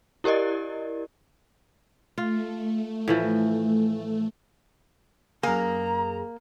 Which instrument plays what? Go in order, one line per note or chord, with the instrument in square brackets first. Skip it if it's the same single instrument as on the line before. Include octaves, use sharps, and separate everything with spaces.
[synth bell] E4 G4 A#4 D5 D#5
[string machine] A3 [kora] F4
[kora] A2 E3 F3
[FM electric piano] F#2 G#4 [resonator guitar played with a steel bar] A#3 [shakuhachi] A#5